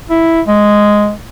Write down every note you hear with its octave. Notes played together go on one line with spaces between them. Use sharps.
E4
G#3